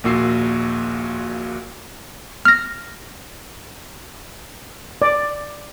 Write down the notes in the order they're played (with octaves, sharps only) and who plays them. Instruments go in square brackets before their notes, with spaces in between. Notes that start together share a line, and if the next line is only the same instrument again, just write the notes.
[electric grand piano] A#1 D#2 A#2 F#4 E6 C7
[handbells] F6 A#6
[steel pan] D5